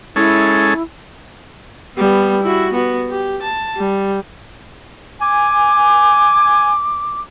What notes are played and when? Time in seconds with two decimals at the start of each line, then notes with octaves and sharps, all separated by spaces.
0.16 G#3 C#4 E4 A4
1.97 G3 B3
2.42 E4 F#4
2.73 B3 F#4
3.09 G4
3.42 A5
3.76 G3
5.21 G#5 D6